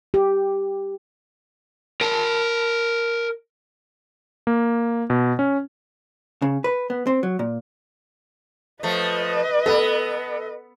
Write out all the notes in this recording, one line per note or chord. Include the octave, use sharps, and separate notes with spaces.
G4
A#4 A5
A#3
B2
C#4
C#3
B4
B3
C4
F#3
A#2
F3 A3 B4 D#5
B3 A4 B5